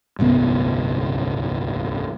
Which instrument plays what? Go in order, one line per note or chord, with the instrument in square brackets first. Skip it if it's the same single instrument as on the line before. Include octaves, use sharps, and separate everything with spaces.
[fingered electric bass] D1 G1 C2 B3